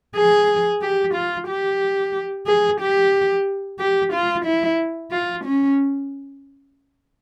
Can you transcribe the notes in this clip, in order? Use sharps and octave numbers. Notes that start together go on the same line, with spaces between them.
G#4
G4
F4
G4
G#4
G4
G4
F4
E4
F4
C#4